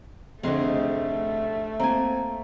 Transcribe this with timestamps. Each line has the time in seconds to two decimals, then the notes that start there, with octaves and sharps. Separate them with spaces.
0.43 F1 D3 A3 C4 G#4 D#5
1.80 A#3 C4 G#5 A#5